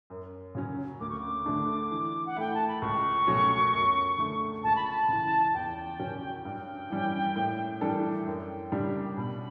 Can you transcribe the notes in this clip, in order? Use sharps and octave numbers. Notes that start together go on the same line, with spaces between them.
F#2
C#3 F#3 C#4
D2 D6
C#6
D6
D3 A3 D4
E3
F#5
A3 E4 G5
A5
B5
C#2 C#6
B2 F#3 A3 C#4
F#2
D3 A3
C#2 A5
B5
A5
C#3 E3
E2 G5
C#3 F#3 C#4 F#4
G2 G5
E3 G3 C#4
A2
E3 G3 D4 A4
F#2 G5
C#3 G3 D4 G4
B2 B5